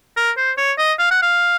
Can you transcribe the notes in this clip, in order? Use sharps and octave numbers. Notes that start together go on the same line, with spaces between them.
A#4
C5
C#5
D#5
F5
F#5
F5